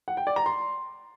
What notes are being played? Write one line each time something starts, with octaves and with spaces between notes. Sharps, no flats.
F#5
G5
D5
A#5
C6